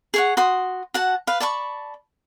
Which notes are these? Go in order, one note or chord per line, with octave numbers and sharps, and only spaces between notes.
G#4 C#5 F#5
F#4 C6 D#6
F#4 F#5 A5
B4 F5
D5 A5 B5 C#6